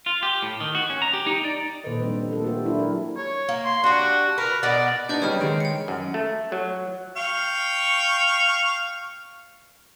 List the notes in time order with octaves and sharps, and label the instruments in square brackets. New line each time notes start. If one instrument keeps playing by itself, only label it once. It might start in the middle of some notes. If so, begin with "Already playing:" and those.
[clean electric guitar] F4
G4
A2
D#3
F#4
C#4
A#5
G4
D#4
D5
[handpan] A#2 D#3 A4 B4 C5 D#5
F3 G3 C4 D4
A3 A#3 A4
E4 F#4 G4 C5
F#3 G#3 D4 E4 A4
F#3 G4 A#4
[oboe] C#5
[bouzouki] A#3
[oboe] C6
[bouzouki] D4 G4 [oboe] F#4
[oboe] A#4 [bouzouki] B4
[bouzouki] B2 B3 [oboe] D5
[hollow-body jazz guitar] D4 D#4 [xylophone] B4 D#5 G6
[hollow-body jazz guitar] C#3 F#3 G3 [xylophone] C#5 G5 F6
[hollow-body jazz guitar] D#3 G#3 [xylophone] D7
[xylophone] G5 C#7
[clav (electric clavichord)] F#2
A3
F#3
[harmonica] F5 G5 C#6